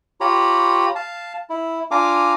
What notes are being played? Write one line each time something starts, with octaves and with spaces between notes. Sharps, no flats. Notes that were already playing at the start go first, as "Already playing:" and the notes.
F4 G4 C#5 A#5 B5
F5 A5
E4
D4 F4 F5 G#5 A#5 D6